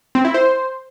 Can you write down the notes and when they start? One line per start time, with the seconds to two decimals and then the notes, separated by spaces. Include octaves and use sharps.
0.15 C4
0.25 E4
0.34 C5